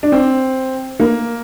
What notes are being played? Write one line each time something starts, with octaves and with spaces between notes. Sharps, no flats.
D4
C4
A#3